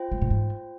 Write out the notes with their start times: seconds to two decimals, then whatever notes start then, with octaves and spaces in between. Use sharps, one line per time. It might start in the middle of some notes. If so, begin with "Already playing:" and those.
Already playing: F4 C5 G5
0.12 G#3
0.22 A#2
0.30 G#2